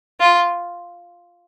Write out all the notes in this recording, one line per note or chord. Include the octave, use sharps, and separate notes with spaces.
F4